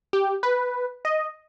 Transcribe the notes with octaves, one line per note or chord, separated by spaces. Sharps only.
G4
B4
D#5